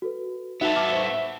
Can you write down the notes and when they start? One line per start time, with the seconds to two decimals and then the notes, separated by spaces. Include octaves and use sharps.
0.02 F#4 A4 B4
0.61 B3 D#4 F#4 A4 E5 F7
0.76 A5 D6 F6
0.92 C5 C#6